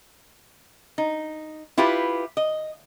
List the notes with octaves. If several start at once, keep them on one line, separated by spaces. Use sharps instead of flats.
D#4
E4 F4 G4 B4
D#5